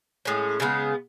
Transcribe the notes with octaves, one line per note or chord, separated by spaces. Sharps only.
A2 G#3 C#4
C#3 G#3 B3